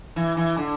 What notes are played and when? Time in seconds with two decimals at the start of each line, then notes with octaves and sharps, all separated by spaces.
0.16 E3
0.37 E3
0.57 D3